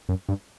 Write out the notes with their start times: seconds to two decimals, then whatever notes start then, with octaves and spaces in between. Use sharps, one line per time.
0.09 F#2
0.29 G2